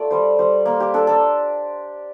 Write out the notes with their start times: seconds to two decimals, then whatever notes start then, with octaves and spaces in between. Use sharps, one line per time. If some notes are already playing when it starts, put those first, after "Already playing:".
Already playing: A3 F4 D5
0.11 G3 C5
0.39 G3 C5
0.66 A#3
0.80 G4
0.94 D4 A4
1.07 A4